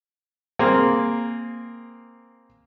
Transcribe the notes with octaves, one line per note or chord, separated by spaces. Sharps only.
A#3 C4 G#4